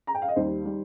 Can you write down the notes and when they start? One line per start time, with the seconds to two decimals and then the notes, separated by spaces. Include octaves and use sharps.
0.07 A#5
0.15 G5
0.22 F5
0.28 D#5
0.36 D#2 D#3 G3 C5
0.65 D#3 G3